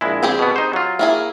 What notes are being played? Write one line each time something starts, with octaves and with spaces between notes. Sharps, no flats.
A#1 G#3 E4
C4 G4 G#4
B2 B3
D#4 C5
F#3 F4
A#3 E4 G#4